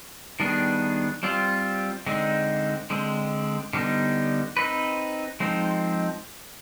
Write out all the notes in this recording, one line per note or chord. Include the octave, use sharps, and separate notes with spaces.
D#3 G3 B3 D4 G#4
G3 C4 F4
D3 G#3 C4 D#4
D3 G#3 C4
D3 G3 B3 D#4
C4 D#4 B4
F3 G#3 C4 D#4